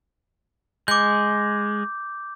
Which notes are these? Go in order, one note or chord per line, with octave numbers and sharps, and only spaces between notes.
G#3 D6 G6